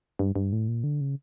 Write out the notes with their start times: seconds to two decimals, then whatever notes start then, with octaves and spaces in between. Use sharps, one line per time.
0.19 G2
0.36 G2
0.53 A2
0.68 A#2
0.84 D3
1.01 C#3